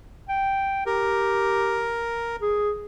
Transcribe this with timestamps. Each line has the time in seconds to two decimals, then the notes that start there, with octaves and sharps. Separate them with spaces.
0.29 G5
0.86 G4 A#4
2.42 G#4